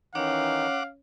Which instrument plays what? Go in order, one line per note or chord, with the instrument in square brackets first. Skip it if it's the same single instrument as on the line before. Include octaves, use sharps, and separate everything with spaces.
[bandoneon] D#3 E3 D#4 [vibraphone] C#4 C#5 [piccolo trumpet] F5 [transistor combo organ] F#5 D6